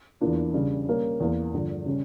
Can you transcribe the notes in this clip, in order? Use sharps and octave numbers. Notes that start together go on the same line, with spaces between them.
E2 E3 A#3 D4 F4
C#3 G3 D4
G3 A#3 C#4
E2 E3 A#3
G2 D3 F3
C#3 G3 C#4